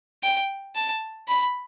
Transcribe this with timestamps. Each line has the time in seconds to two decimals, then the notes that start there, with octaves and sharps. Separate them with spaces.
0.23 G5
0.76 A5
1.28 B5